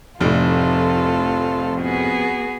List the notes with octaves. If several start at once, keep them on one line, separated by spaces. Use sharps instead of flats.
F1 F2 A2 F3 D#4 F4 A4 D5
B3 F#4 G#4